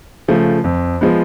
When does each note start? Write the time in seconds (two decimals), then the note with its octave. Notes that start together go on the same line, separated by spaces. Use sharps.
0.28 C#3 F3 A3
0.64 F2
1.01 F3 G#3 B3